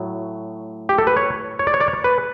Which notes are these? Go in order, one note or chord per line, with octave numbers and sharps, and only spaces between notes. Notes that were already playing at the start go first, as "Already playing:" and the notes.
Already playing: A2 F#3 A3
G4
A4
B4
C#5
C#5
D5
C#5
D5
C#5
B4